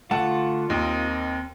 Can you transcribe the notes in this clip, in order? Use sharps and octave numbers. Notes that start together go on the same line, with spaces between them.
D3 A3 F4 F#5 A5
D#2 C4 A#4 D#5